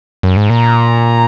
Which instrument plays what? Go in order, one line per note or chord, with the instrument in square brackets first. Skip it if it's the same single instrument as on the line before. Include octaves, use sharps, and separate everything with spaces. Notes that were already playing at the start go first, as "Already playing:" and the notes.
[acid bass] F#2
G#2
[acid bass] A#2 [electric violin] A#5